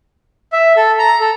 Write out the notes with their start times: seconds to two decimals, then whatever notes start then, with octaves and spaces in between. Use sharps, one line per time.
0.53 E5
0.77 A4
0.99 A#5
1.21 A4